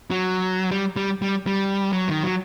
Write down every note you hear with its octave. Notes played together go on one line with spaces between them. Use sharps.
F#3
G3
G3
G3
G3
F#3
D#3
F#3